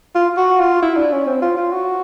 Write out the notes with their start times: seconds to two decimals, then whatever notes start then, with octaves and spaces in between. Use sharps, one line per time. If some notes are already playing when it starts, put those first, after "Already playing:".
0.15 F4
0.37 F#4
0.60 F4
0.83 E4
0.97 D4
1.12 C#4
1.27 C4
1.42 F4
1.57 F4
1.72 F#4